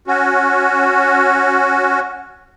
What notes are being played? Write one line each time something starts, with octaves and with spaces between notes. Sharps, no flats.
C#4 F#4